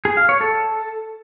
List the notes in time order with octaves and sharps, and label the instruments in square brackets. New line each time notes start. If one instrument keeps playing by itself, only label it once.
[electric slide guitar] G#4
F5
C#5
A4